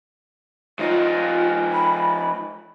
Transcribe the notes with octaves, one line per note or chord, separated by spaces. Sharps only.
F3 D#4 F4
B5